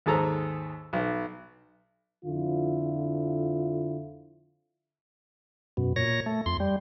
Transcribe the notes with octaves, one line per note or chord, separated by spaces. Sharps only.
D#2 G#2 G#4 A4 A#5
B1
F2 D3 F3 E4 F4
F#2 B2
A#2 C#5 A#6
A3
F2 C6
G3